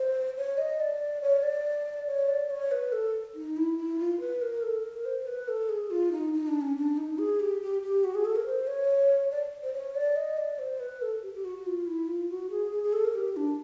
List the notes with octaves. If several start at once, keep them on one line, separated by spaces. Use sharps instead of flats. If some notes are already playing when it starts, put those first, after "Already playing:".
Already playing: C5
C#5
D#5
D5
C#5
D5
C#5
D5
C#5
B4
A4
D#4
E4
E4
F4
B4
A#4
A4
A#4
C5
B4
A4
G#4
F4
D#4
D#4
D4
C#4
D4
D#4
G#4
G4
G4
G4
F#4
G#4
A4
A#4
C5
C#5
D5
C5
C#5
D5
D#5
D5
C5
B4
A4
G4
G4
F#4
F4
E4
F4
F#4
G#4
G#4
G#4
A4
A#4
G4
D4